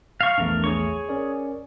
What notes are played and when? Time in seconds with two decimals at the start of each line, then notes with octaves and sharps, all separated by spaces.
0.21 F5 C#6
0.38 A#1 E2 A3 D4 A#4
0.64 G#4 C#5 C#6
1.09 C#4 A#4 D5